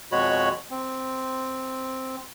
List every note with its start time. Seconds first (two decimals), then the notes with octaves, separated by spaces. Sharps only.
0.12 F2 B2 G#3 F#4 C#5 B5
0.71 C4